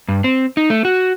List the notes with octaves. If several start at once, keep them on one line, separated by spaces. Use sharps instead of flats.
G2
C4
D#4
A3
F#4